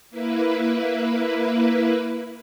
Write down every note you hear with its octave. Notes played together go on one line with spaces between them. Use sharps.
A#3 E4 B4